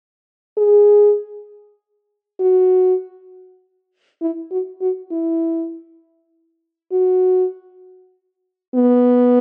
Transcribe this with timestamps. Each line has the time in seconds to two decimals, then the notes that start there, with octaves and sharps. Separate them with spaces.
0.58 G#4
2.40 F#4
4.21 E4
4.51 F#4
4.81 F#4
5.12 E4
6.92 F#4
8.75 B3